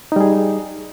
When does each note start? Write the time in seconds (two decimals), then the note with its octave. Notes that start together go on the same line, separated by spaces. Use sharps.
0.12 D#4
0.16 G3
0.21 G#4